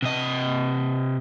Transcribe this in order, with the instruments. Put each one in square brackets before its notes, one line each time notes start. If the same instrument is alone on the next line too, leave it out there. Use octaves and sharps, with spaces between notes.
[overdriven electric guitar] C3 D#5